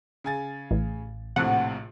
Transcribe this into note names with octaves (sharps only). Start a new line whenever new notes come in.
C#3 G#5 A6
A1
A#1 A2 C3 F#5